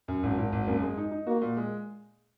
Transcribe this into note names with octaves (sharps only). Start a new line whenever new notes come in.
F#2
G#1
G#1
G#1
F#2 A#3
G#3
D#4
D#4
A#3 F#4
A#2
G#3